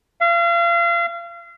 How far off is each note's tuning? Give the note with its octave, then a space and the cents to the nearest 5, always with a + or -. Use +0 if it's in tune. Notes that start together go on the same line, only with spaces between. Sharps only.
F5 -35